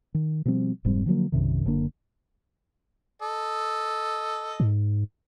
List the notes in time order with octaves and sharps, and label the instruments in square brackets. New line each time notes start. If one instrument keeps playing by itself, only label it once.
[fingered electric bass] D#3
B2 F3 G3 C4
F1 G#2 G3 C4
D3 F3 F#3 A#3
B1 F#2 C3 D#3
F#1 D3 A#3 D4
[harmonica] A4 D#5
[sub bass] G#2